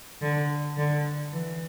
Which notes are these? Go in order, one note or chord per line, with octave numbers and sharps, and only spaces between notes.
D3
D3
E3